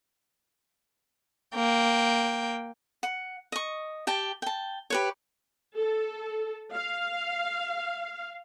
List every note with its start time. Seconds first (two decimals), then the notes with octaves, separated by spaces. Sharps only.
1.55 A#3 G5
3.03 F#5
3.52 D#5 C#6
4.07 G4 G5 A5
4.42 G5 A5
4.90 G4 B4 C#5
5.77 A4
6.73 F5